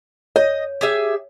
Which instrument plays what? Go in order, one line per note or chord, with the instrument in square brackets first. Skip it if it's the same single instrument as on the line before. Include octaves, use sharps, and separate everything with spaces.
[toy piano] C#5 [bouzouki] D#5
[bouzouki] G4 G#4 E5